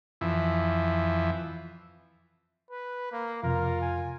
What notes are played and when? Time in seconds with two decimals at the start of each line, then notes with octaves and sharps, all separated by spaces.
0.21 F2 E3
2.71 B4
3.12 A#3
3.43 F2 C3 F4 A#4
3.81 G#5